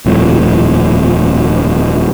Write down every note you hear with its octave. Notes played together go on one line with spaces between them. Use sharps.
D#1 F2 A2